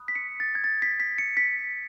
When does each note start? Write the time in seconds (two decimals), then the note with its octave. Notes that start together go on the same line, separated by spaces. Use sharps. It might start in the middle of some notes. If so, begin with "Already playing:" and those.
Already playing: B5 D#6 F#6
0.08 B6
0.15 C#7
0.40 A6
0.55 G#6
0.64 A6
0.82 B6
1.00 B6
1.18 C#7
1.37 B6